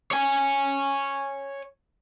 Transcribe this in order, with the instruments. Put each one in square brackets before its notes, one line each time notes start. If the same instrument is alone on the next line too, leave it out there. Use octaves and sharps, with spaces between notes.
[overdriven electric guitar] C#5 G#5